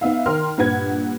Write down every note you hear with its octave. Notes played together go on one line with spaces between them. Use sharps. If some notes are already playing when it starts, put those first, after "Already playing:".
B3 D#4 E5 F5
D#3 A#4 C6 F6
G2 A#2 B4 F#5 G#6